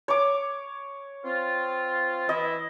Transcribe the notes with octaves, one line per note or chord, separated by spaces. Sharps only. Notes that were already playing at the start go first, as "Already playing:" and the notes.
C#5 D6
C4 F4
E3 E4 D#5